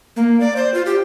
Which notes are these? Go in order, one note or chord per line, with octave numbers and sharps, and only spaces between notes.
A#3
D5
C5
F4
G4